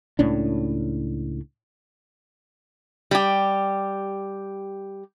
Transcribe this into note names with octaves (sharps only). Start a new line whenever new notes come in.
C#2 A2 C#4 D4
G3 G4